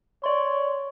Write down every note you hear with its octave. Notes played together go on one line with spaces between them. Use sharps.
C#5 D5 C6